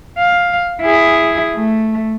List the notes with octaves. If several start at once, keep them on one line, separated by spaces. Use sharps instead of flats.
F5
E4 G#4
A3